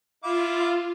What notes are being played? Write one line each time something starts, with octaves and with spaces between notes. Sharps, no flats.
E4 F4 F5 D6